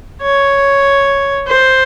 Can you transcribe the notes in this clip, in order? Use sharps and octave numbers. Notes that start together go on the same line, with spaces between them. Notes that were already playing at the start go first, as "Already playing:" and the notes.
C#5
C5